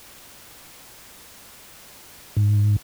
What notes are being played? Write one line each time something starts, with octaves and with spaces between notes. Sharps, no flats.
G#2